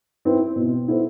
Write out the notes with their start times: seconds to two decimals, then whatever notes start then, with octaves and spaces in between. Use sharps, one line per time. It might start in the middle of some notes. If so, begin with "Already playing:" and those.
0.25 C4 E4 B4
0.56 B2
0.88 B3 E4 A4 C5